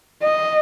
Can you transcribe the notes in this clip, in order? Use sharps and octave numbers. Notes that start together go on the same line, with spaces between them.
D#5